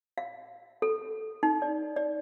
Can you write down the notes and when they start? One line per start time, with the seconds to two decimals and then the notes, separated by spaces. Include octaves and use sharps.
0.18 F5
0.82 A4
1.43 D#4
1.62 D5
1.96 D5